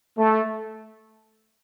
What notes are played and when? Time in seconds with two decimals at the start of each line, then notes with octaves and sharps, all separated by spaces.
0.17 A3